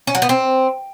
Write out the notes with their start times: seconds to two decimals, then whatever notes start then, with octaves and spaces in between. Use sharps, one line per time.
0.07 C#4
0.15 F#3
0.22 B3
0.29 C4